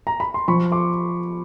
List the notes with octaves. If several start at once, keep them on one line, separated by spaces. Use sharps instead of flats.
A#5
B5
C6
F3 B5 C#6
C6 D6